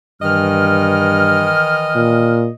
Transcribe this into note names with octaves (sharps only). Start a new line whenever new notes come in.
G2 D#3 E3 D#5 F6
A#2